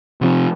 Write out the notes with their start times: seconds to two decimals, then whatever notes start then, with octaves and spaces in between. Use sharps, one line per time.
0.21 C3 F3 C4